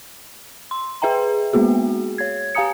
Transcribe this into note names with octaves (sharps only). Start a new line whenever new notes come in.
C6
G#4 B4 E5 G5 A#5
G#3 A#3 B3 F#4 G#4
C#5 G#6
G4 F5 G#5 A#5 D#6 C#7